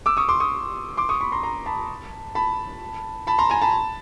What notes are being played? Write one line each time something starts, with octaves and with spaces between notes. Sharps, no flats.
D6 E6
C#6 D#6
C6 D6
C#6 D#6
C6 D6
C#6 D#6
B5 C#6
A#5 C6
A#5 C6
A5 B5
A5 B5
A5 B5
A#5 C6
G#5 A#5
A5 B5